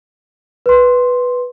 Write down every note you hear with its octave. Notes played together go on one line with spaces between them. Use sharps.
B4 C6